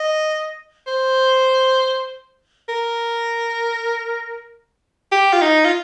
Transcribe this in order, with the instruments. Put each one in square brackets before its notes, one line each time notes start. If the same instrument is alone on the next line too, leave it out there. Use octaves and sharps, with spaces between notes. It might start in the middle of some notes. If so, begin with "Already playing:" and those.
Already playing: [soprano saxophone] D#5
C5
A#4
G4
F4
D#4
F4